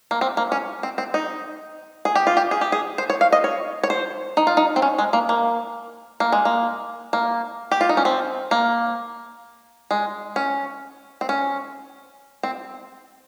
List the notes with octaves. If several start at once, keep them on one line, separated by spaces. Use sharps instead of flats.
A#3
C4
A#3
C#4
C4
C4
D#4
G#4
G4
F4
G4
G#4
G4
G#4
C5
C#5
F5
D#5
C#5
C#5
C5
D#4
F4
D#4
C4
C#4
G#3
A#3
A#3
A#3
G#3
A#3
A#3
G4
F4
D#4
C#4
C4
A#3
G#3
C#4
C4
C#4
C4